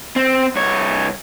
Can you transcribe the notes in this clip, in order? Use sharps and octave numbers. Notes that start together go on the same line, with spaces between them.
C4
C2 C#5